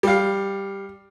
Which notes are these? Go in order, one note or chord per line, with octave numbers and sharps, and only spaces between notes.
G3 F5